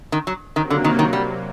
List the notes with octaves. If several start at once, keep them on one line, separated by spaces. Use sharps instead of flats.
D#3
F#3
C3 D#3 F#3 A#3
D3
D#3
D#3
G3